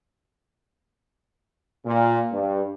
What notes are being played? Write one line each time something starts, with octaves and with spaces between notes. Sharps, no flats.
A#2
G2